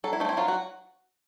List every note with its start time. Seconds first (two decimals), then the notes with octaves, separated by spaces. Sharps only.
0.04 F#3 A4
0.13 E4
0.20 A3 D#4
0.25 C4 E4
0.37 F#3 F4
0.48 F#4